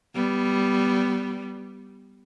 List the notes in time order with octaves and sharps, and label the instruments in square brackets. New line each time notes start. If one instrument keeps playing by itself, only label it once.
[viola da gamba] G3 B3